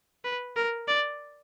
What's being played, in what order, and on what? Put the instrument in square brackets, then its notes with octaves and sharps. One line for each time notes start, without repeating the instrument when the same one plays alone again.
[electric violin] B4
A#4
D5